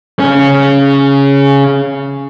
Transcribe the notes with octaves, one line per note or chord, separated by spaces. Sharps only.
C#3 C#4